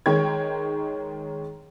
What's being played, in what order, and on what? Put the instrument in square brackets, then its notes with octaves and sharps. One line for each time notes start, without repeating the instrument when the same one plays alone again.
[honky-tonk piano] D#3 G#3 C#5 G5 G#6